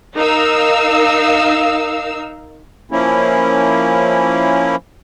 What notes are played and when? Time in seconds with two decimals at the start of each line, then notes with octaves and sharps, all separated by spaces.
0.15 D#4 A#4 F5 E6
2.91 F3 A#3 C#4 E4